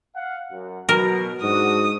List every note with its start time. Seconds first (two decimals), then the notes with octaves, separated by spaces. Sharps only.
0.14 F5 F#5
0.51 F#2
0.89 B2 F#3 A#4
1.43 G#2 D4 F#4 D#6